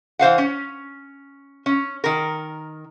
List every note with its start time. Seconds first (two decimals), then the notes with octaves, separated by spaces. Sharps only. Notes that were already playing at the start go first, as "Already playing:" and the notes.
0.19 E3 C5 F5 F#5
0.38 C#4
1.66 C#4
2.04 D#3 A#4